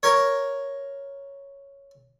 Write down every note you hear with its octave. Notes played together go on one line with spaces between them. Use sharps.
A#4 C#5